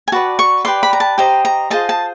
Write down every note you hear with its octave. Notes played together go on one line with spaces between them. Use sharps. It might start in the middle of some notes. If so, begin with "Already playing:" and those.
G#5
F#4 B4 D5 A5
C#6
G4 B4 D5 C6
B5
A#5
A5
G4 C5 D#5 A#5
A#5
F4 G#4 C5 D#5 A5
A5